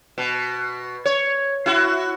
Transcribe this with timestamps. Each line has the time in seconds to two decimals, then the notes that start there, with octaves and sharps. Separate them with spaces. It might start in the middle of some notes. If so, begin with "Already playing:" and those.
0.18 B2
1.05 C#5
1.66 E4 F#4